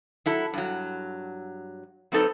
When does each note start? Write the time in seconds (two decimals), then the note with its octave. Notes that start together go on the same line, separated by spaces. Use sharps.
0.26 F#3 E4 A4
0.54 G2 F#3
2.12 F#3 C4 D#4 A4 B4